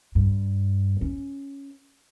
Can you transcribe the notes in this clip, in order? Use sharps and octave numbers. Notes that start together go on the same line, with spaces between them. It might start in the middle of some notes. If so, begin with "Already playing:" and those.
G2
C#4